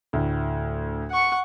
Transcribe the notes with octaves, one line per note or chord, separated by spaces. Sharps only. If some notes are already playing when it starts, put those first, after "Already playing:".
D2 A2
F#5 C#6